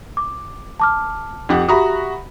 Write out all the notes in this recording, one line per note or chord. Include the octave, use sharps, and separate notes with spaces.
D6
A5 D6 F6
F2 G4 F#5
F#4 G4 E5 A#5 B5 D#6